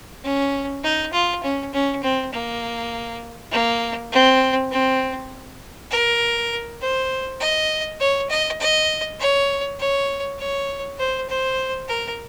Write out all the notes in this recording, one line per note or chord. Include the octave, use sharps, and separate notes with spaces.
C#4
D#4
F4
C#4
C#4
C4
A#3
A#3
C4
C4
A#4
C5
D#5
C#5
D#5
D#5
C#5
C#5
C#5
C5
C5
A#4